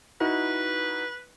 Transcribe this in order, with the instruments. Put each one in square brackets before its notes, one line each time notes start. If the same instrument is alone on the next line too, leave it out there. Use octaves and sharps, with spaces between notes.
[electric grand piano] D#4 E4 F#4 [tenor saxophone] B4